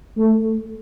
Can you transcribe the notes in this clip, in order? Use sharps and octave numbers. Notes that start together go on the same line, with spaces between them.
A3